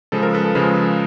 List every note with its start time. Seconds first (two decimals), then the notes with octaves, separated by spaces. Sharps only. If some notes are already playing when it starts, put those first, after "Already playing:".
0.12 C#3 F3 G#3 A4
0.23 A#4
0.34 A4 B4
0.44 A4
0.55 C#3 F3 G#3